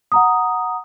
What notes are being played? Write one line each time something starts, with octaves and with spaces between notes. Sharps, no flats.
F#5 A#5 D#6